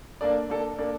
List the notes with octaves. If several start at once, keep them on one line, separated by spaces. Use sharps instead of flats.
A#3 D4 A4 D5
A#3 D4 A4 D5
A#3 D4 A4 D5